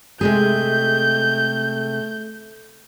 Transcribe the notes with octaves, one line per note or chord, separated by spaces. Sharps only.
C3 G#3 A3 G#4 G6